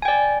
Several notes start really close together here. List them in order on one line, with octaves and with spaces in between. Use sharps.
G#5 G5 D5